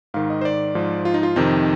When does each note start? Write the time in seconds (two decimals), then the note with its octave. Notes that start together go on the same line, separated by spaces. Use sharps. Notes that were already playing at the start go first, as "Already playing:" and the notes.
0.14 G#2 D#3 F5
0.30 D#5
0.41 C5
0.45 D5
0.75 G#2 F3
1.05 F4
1.14 D#4
1.23 F4
1.36 F2 C3 D#3 D#4